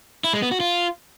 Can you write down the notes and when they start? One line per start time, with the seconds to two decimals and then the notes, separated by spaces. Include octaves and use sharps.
0.24 E4
0.33 G#3
0.42 B3
0.51 F#4
0.60 F4